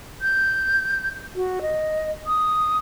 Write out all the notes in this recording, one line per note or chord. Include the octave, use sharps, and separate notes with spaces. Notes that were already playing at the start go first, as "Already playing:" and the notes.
G6
F#4
D#5
D#6